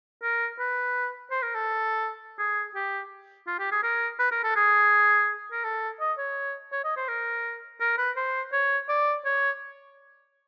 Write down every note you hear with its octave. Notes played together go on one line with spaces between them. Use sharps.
A#4
B4
C5
A#4
A4
G#4
G4
F4
G4
G#4
A#4
B4
A#4
A4
G#4
A#4
A4
D#5
C#5
C#5
D#5
C5
A#4
A#4
B4
C5
C#5
D5
C#5